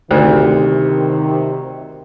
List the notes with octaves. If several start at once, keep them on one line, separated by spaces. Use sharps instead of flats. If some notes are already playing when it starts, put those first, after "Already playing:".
D2 C3 D#3